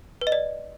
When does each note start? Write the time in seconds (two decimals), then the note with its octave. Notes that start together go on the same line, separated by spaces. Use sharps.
0.21 B4
0.27 D#5
0.32 D5